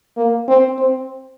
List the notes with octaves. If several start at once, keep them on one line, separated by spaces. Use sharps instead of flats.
A#3
C4
C4